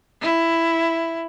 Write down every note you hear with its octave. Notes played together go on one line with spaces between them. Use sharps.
E4